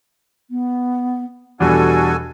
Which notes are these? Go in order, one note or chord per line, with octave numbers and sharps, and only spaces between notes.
B3
E2 B2 G3 D4 F#4 A4 G#5